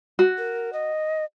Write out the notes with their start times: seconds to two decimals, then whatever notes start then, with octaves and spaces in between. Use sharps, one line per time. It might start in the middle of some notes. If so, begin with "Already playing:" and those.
0.19 F#4
0.38 A#4
0.73 D#5